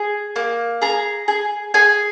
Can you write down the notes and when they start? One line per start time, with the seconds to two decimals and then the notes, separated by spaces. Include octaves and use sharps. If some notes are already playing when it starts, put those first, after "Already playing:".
Already playing: G#4
0.36 A#3
0.82 G#4 A#5
1.28 G#4
1.74 G#4 G#5